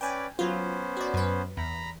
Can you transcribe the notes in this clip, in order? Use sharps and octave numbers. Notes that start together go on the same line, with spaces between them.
C#4 B4 D5 G5 G#5
F#3 B3 C#4 F4 C5
F#4 D5
F#2 B4
E2 A#5 B5